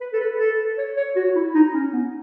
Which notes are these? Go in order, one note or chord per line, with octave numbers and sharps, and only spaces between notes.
B4
A4
B4
A4
C#5
C#5
F#4
E4
D#4
C#4
B3